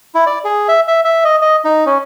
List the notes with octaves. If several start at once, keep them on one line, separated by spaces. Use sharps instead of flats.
E4
D5
G#4
E5
E5
E5
D#5
D#5
D#4
C#4